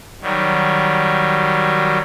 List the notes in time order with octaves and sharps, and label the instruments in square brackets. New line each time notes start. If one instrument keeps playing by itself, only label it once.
[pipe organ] D#3 F#3 G3